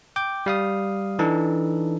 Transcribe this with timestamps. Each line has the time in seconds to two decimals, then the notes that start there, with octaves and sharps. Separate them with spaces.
0.16 G5 D6 G6
0.46 G3 F5 D#6
1.19 E3 D4 D#4 A4